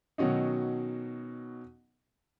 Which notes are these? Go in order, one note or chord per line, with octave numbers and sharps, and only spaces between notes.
B2 D#3 F#3 C#4 D#4